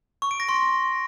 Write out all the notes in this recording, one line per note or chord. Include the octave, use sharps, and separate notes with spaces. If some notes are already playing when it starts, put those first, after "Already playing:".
C#6
D7
A#6
C6